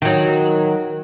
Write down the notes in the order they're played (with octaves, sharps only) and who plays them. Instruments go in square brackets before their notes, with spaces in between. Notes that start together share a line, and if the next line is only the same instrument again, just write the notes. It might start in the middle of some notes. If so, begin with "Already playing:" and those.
[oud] D#3 F#3